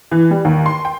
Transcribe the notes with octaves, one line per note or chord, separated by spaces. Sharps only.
E3
G3
D#2
C6
G5